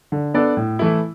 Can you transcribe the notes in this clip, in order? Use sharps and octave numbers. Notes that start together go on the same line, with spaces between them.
D3
B3 D4 A4 D5
A2
E3 A3 E4